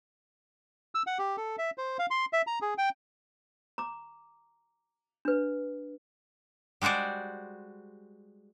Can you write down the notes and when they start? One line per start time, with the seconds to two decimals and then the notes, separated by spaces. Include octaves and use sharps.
0.95 E6
1.07 F#5
1.18 G4
1.37 A4
1.58 E5
1.78 C5
1.99 F5
2.10 C6
2.33 E5
2.47 A#5
2.62 G#4
2.78 G5
3.78 A#5 D6
5.25 D4 B4
6.82 G3 G#3 F#4 C5 D5